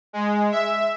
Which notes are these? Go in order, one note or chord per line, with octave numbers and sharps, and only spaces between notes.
G#3
E5